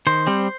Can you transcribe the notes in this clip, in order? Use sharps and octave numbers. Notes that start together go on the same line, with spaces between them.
D#3 C5
G3 C4